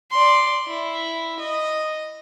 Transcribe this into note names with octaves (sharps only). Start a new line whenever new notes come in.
D5 C6
E4
D#5